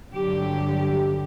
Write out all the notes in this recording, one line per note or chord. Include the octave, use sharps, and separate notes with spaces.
G2 D3 F#3 G4